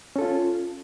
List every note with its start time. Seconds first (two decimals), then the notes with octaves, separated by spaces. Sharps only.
0.16 C#4
0.19 A4
0.21 F4